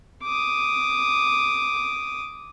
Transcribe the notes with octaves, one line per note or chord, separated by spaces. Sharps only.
D6 D#6